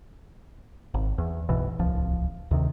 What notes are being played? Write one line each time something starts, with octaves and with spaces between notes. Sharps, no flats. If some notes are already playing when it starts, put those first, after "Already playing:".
G#1
E2
F#1 B1 B2 E3
D1 C2 F3
D2 C3 D#3